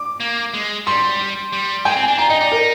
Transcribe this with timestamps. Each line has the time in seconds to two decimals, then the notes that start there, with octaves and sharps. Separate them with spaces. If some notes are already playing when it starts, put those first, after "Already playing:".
Already playing: D6
0.20 A#3
0.54 G#3
0.86 G3 C6
1.53 G3
1.85 G#3 G5
1.96 C4
2.02 G#5
2.08 D4
2.18 F4 A#5
2.30 D#4 D#5
2.41 D#4 D5
2.52 A#4